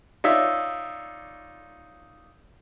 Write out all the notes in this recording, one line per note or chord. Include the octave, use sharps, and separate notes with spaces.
D#4 F4 C#5 D5 E5